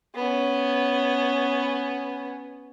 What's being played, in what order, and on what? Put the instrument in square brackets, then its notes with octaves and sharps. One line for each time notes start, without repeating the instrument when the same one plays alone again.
[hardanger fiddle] B3 C#4